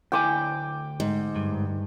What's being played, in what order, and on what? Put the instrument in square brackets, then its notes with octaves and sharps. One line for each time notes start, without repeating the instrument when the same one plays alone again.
[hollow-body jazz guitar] D2 E4 G#5 [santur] G5 D6
[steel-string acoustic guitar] G#2
[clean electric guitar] G2